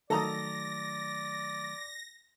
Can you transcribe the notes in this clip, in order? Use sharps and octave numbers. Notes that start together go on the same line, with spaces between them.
D#3 F#3 A3 A4 D5 A#5 D#6 A#6